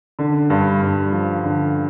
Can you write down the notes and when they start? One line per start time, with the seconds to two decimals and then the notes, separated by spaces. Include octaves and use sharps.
0.19 D3
0.50 G2
0.82 G2
1.12 F3
1.44 D3